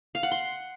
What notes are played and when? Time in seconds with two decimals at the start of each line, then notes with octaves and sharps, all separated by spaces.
0.15 F5
0.23 F#5
0.31 C6